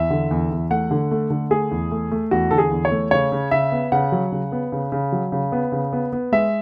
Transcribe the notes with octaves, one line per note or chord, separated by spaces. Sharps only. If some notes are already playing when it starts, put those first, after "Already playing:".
Already playing: E2 E5
D3
E2
E2
A3 F#5
D3
A3
D3
A3 G#4
E2
A3
A3
E2 F#4
D3 A4
G#4
E2
C#5
A3
C#3 C#5
C#3
C#3 E5
B3
C#3 F#5
F#3
C#3
B3
C#3
C#3
F#3
C#3
B3
C#3
B3
B3
G#3 E5